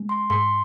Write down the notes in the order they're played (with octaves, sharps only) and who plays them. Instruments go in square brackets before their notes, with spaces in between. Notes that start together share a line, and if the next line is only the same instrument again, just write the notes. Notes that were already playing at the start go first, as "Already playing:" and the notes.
Already playing: [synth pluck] G#3
[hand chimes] C6
[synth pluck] G#2 [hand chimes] C6